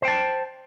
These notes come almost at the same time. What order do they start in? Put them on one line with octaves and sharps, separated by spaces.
C5 G5 A5